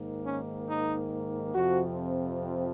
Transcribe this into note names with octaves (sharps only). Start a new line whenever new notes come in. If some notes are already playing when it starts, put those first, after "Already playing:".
Already playing: G#2 D#3 A#3
C#4
D#4
F2 C3 F3 C4 F#4